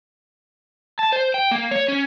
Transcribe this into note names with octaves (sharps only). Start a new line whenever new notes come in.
A5
C5
G5
A#3
C#5
C#4